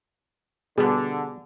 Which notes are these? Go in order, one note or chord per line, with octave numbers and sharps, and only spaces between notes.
B2 D3 G3 B3 G#4